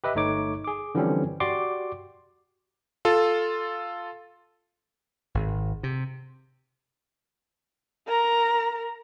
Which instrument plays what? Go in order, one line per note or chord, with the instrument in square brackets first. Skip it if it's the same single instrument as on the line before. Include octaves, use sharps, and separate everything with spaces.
[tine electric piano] G4 B4 D#5 E5
G1 A3 D#4 C#5 D6
G#4 D6
D3 E3 F3 G3 C4 C#4
F#4 G4 D5 C6 D6
[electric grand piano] F4 A4
[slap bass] G#1
C3
[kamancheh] A#4 A#5